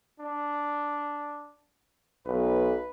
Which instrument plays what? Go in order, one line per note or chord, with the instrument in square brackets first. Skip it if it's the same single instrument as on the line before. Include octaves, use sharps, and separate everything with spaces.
[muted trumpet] D4
[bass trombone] B1 [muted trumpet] B4